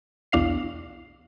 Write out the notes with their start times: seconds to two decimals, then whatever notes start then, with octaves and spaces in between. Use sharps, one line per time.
0.32 B1 E2 D4 F5 C7